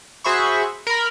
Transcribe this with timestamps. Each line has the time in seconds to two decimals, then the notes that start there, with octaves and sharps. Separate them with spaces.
0.24 F#4 G#4 C5 E5 B5 C#6
0.87 A#4 B5